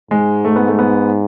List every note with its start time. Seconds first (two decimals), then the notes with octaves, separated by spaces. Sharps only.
0.11 G#2 G#3
0.45 A3
0.56 B3
0.68 A3
0.79 B3